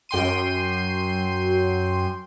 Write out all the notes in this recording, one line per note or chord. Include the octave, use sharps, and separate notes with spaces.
F#2 G5 C6 D#7